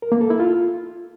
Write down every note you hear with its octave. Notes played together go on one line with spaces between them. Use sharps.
A#4
A#3
A4
E4
F4